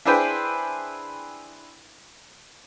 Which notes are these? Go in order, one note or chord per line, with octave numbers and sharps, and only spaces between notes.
D4 E4 G#4 B4 C5 G5